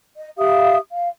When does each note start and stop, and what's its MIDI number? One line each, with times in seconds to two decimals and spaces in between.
0.15 0.30 75
0.38 0.76 67
0.38 0.76 76
0.38 0.76 77
0.38 0.76 87
0.93 1.08 77